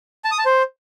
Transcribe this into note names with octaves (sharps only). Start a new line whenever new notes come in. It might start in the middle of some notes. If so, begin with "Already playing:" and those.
A5
D#6
A5
C5